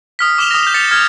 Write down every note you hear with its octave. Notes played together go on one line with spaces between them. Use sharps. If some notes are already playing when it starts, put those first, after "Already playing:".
D#6 F6 B6
D6 F6 E7 F7 G7
D#6 A#6
G6 F7
A6 B6 C#7
F6 G#6